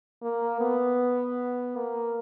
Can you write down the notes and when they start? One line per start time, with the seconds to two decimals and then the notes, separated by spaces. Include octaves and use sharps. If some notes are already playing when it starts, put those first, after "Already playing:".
0.22 A#3
0.61 B3
1.76 A#3